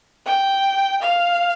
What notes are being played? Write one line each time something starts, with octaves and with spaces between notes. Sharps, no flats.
G5
F5